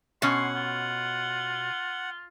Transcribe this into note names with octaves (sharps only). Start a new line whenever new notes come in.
B2 C#4 F#5 C6
F4